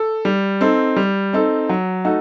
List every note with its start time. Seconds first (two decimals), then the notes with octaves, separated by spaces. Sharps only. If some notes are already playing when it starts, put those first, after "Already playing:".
Already playing: A4
0.25 G3
0.61 C4 D#4 A4
0.96 G3
1.33 C4 D#4 A4
1.69 F#3
2.05 A3 D#4 F#4 A4